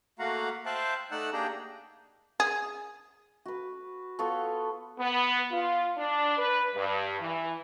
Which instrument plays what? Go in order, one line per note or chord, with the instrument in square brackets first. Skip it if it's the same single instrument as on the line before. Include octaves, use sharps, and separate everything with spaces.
[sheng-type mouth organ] A3 A#3 F#4 F5 F#5 A#5
C5 E5 F5 G5 A5 F#6
A3 D#4 D5 F#5 E6 F#6
A#3 D4 G4 G#4 G5 A#5
[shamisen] G#4
[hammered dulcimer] F#4 B4
B3 F4 A4 C#5
[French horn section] B3
F4
D4
B4
G2
E3